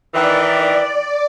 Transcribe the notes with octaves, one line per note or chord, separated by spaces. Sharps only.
D#3 E3 D5